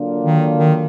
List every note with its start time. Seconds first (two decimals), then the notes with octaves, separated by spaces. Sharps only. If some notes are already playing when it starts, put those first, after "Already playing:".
Already playing: D3 F#3 A#3 D4 F4
0.23 D#3
0.58 D#3